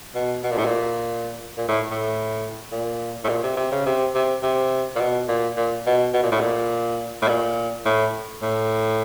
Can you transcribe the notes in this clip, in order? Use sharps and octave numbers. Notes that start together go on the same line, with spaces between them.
B2
B2
A#2
A2
A#2
A#2
A2
A2
A#2
A2
A#2
C3
C3
C#3
C3
C3
C3
A#2
B2
A#2
A#2
B2
B2
A#2
A2
A#2
A2
A#2
A2
A2